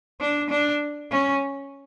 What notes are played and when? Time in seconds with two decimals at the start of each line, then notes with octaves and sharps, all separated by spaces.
0.21 D4
0.50 D4
1.11 C#4